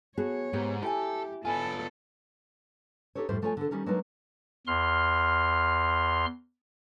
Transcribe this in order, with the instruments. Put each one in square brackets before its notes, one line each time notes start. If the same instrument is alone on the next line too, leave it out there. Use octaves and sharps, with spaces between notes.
[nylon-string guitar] B3 F#4 G#4 [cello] C#5 [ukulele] A5
[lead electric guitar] G#2 [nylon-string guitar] B3 [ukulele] D#4 G4 A#5
[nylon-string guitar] E4 [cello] G4 [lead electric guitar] A4 [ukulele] E5 G5 G#5
[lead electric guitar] B3 F4 [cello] A4 [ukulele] G#5 B5
[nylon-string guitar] D4 D#4 G4 A4 C5 C#5
F2 A2 G3 C5
F3 A3 B3 F4 C#5 G#5
D3 A4
D#3 G3 C#4 D#4
F#3 G#3 A#3 D4 D#4 B4
[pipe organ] E2 C6 F6